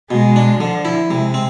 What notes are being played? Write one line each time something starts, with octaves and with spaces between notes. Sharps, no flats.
B2 G#3
D4
D3 F3
E4
C3 G#3
C4